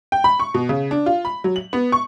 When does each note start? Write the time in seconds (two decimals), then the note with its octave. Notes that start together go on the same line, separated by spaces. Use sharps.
0.12 G5
0.24 B5
0.40 C#6
0.54 B2
0.69 C#3
0.91 D4
1.06 F4
1.25 B5
1.44 F#3
1.56 F#7
1.73 B3
1.92 C#6